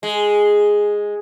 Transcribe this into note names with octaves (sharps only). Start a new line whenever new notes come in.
G#3